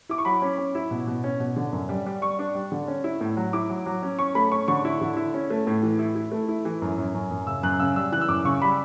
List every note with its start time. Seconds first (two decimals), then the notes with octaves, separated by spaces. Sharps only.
0.09 E4 D6
0.18 C#6
0.25 F#3 B5
0.42 C#4
0.58 C#4
0.75 E4
0.91 B2
1.07 B2
1.24 C#4
1.40 B2
1.56 D3
1.73 F#2
1.89 G3
2.06 G3
2.22 G3 C#6
2.39 D4
2.55 G3
2.72 D3
2.88 C#4
3.04 E4
3.21 A2
3.37 F#3
3.53 E4 D6
3.70 F#3
3.86 F#3
4.03 C#4
4.19 C#4 C#6
4.35 A3 B5
4.52 C#4 C#6
4.68 D3 C#6
4.85 E4
5.01 D3
5.17 E4
5.34 C#4
5.50 A3
5.67 A2
5.83 E3
5.99 E4
6.15 E4
6.32 A3
6.49 E4
6.65 E3
6.82 F#2
6.98 F#2
7.14 F#2
7.31 F#2
7.47 C#3 E6
7.63 F#2 F#6
7.80 C#3 E6
7.96 G3 E6
8.12 E3 F#6
8.21 E6
8.28 F#2 D6
8.45 C#3 C#6
8.61 G3 B5